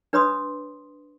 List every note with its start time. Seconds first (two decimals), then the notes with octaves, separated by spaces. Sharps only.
0.13 D4 B4 C#5 B5 C6 D#6